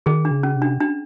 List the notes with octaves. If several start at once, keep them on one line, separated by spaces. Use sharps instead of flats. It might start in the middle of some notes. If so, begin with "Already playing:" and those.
D#3 G#4
D4
C#3
C#4
C3
D4
D4